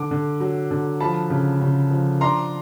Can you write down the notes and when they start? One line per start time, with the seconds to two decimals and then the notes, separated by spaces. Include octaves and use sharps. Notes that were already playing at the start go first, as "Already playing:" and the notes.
Already playing: D3 D6
0.11 D3
0.40 F#3
0.71 D3
1.00 F3 A5 B5
1.30 C#3
1.61 C#3
1.91 F3
2.21 D4 A#5 C6